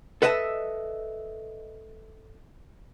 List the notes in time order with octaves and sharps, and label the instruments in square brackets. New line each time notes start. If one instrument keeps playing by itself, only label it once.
[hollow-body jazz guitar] A4 B4 D#5 E5 G5 A5